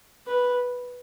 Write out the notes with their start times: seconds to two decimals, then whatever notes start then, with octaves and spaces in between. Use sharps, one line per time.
0.26 B4